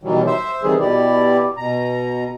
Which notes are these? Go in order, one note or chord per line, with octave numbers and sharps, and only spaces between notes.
B2 D#3 E3 F#3 G3
C5 E5
C3 D#3 E3 G3 G#4
B2 E4 G4 D5
B2 A#5